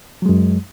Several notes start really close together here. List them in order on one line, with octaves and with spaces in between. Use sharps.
F#3 G#3 F#2